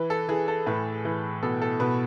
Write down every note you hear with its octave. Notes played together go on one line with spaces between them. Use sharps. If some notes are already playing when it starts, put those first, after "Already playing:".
Already playing: E3 B4
A4
E3 G#4
A4
A2 B4
E3
B2 A4
A4
B2 B4